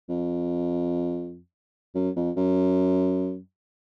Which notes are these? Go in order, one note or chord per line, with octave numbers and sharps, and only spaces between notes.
F2
F#2
F2
F#2